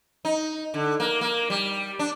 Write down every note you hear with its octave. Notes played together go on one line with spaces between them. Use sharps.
D#4
D3
A#3
A#3
G3
D4